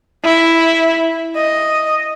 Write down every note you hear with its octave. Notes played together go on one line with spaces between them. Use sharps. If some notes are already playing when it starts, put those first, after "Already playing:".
E4
D#5